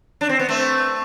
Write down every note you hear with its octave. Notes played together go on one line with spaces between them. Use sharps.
D4
C4
B3
A3 C4